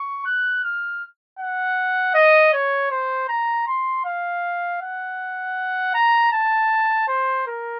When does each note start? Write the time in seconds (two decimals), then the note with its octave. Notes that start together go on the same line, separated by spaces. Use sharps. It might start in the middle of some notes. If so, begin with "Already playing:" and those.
Already playing: C#6
0.25 F#6
0.64 F6
1.39 F#5
2.14 D#5
2.53 C#5
2.91 C5
3.29 A#5
3.68 C6
4.05 F5
4.81 F#5
5.94 A#5
6.32 A5
7.08 C5
7.47 A#4